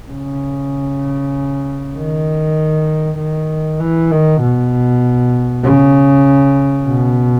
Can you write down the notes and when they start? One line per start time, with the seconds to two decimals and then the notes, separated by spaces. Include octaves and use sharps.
0.11 C#3
1.97 D#3
3.18 D#3
3.80 E3
4.11 D#3
4.42 B2
5.64 C#3
6.87 B2